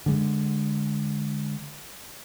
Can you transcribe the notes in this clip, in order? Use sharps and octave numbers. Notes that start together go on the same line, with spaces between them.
D3 G#3